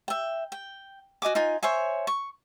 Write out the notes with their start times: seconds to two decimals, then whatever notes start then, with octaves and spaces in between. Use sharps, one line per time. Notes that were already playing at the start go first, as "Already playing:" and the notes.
0.08 E5 G5
0.52 G5
1.22 F#4 D#5 G#5 D6
1.35 D#4 F4 G#5
1.63 C5 C#5 E5 G#5
2.07 C#6